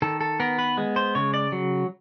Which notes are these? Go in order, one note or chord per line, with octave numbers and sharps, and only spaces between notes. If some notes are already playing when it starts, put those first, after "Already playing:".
D#3 A4
A4
B3 A#4
B4
G#3
C5
C#3 C#5
D5
F#3